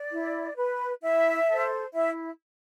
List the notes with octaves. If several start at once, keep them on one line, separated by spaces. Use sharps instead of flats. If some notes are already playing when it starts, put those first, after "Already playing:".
Already playing: D5
E4
B4
E4 E5
A4 C5
E4 E5